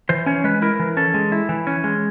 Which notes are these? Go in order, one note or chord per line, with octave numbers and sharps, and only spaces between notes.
E3 C5
C#4 C#5
G#3 B4
E4 A#4
E3
C#4 A4
G#3
E4
E3
C#4
G#3